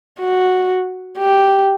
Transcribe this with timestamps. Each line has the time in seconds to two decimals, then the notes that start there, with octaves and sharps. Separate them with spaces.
0.21 F#4
1.18 G4